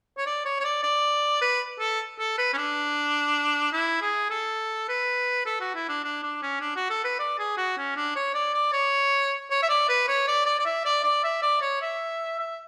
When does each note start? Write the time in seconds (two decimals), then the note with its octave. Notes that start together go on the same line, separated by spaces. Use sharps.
0.18 C#5
0.26 D5
0.45 C#5
0.60 C#5
0.64 D5
0.83 D5
1.41 B4
1.80 A4
2.19 A4
2.38 B4
2.53 C#4
2.57 D4
3.72 E4
4.02 G#4
4.30 A4
4.88 B4
5.46 A4
5.60 F#4
5.75 E4
5.88 D4
6.04 D4
6.23 D4
6.42 C#4
6.61 D4
6.76 F#4
6.90 A4
7.04 B4
7.19 D5
7.39 G#4
7.57 F#4
7.77 C#4
7.96 D4
8.16 C#5
8.34 D5
8.54 D5
8.72 C#5
9.51 C#5
9.62 E5
9.69 D5
9.89 B4
10.08 C#5
10.28 D5
10.46 D5
10.59 D5
10.65 E5
10.85 D5
11.03 D5
11.24 E5
11.42 D5
11.61 C#5
11.82 E5
12.39 E5